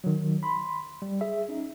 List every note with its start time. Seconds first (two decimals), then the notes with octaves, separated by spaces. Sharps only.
0.04 D#3 F#3
0.43 B5 C6
1.02 G3
1.21 G#4 E5
1.49 C#4 D#4